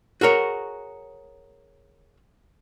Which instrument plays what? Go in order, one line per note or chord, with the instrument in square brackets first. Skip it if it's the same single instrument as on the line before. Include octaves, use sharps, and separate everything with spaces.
[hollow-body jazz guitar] F#4 G#4 A#4 C#5